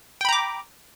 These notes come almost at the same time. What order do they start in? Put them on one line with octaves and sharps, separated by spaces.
G5 B5 A#5 D6